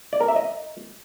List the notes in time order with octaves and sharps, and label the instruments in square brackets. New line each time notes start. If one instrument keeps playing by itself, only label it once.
[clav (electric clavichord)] D5
A#4
E5
D#5